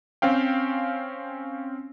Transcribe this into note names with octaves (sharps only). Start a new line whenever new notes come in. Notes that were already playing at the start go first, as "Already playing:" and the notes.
C4 C#4 F5 G5